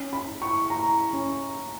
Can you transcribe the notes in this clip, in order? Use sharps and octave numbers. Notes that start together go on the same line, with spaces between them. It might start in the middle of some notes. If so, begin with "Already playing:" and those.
Already playing: C#4
B5
E4
C#6
E4 A#5
C#4